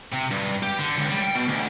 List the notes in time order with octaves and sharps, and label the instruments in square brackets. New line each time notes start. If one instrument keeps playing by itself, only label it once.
[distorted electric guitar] C3
G2
G4
D3
C#2
G3
G5
B2
D2